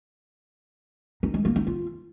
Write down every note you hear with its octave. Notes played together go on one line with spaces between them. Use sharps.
D#4
G#3
A#3
D#4
F4